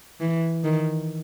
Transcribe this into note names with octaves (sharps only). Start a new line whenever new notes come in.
E3
D#3